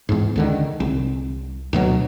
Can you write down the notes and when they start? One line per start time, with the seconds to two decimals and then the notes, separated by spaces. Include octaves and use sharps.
0.09 E2 G#2
0.36 C#2 D3 D#3
0.80 C2
1.73 D2 B2 F#3